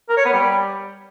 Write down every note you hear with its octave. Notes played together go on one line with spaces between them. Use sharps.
A#4
C#5
B3
G3